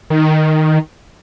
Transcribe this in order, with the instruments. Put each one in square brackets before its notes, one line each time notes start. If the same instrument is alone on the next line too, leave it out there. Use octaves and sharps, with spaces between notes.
[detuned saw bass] D#3